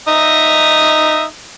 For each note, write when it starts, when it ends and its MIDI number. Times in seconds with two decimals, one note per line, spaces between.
0.08 1.23 63
0.08 1.23 76
0.08 1.23 87